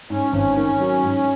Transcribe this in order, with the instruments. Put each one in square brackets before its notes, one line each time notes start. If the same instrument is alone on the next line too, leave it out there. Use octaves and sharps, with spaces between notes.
[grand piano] G#2 [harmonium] C#4
[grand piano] G#1
D#3
F#3
G#2